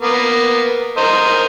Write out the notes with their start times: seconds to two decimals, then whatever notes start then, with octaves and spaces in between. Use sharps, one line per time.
0.02 A#3 B3
0.97 A#4 C5 D#5